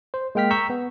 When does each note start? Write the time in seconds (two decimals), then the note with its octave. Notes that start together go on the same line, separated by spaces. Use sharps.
0.14 C5
0.35 G#3 A#3 G5 F6 B6
0.51 A#5 C#6 E6 G6 B6
0.70 B3